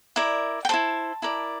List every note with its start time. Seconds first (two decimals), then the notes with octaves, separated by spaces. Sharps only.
0.16 E4 A#4 D5
0.65 G5
0.69 E4 A4 C5 A5
1.22 E4 A#4 D5